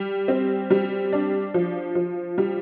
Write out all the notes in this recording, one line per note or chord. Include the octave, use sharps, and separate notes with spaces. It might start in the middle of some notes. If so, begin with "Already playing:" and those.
Already playing: G3
C4
G3
D4
F3
F3
G3